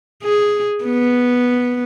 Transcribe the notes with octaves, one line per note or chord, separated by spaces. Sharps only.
G#4
B3